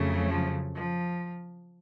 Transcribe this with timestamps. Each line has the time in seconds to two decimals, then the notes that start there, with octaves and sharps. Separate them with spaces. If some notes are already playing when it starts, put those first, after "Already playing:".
Already playing: F2 C#3 F#3 A3
0.31 F3
0.75 F3